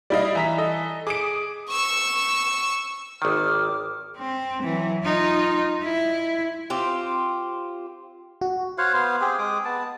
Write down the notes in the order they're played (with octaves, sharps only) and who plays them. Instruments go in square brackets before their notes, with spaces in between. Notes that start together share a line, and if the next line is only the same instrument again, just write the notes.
[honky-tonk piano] G3 E4 D#5 [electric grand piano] D5 F5
[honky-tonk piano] E3 [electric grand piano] E5 A#5 B6
[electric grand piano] A4 D#5
[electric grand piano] G#4 [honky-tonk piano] D6 D#6 D7
[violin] C#6 E6
[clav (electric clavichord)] G#1 D#3 [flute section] D6 D#6 F6
[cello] C4
E3 F#3
D#4 F4
E4
[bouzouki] C4 F4 G4
[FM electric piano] F#4
[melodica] C5 C#5 F5 F#5
B3 C5 F5
C4 G4 G#4
G#3 D6 D#6
B3 A5